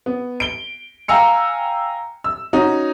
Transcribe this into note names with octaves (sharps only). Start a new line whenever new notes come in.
B3
D7 G7
F5 G5 G#5 A#5 E6 C#7
E6
C#4 D#4 F#4